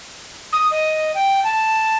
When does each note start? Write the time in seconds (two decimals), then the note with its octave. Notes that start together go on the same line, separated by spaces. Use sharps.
0.53 D#6
0.71 D#5
1.15 G5
1.44 A5